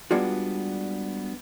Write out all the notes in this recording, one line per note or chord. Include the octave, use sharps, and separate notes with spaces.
G3 G#3 B3 D4 F4 F#4